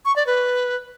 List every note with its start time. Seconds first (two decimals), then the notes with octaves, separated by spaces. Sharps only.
0.05 C#6
0.16 D5
0.27 B4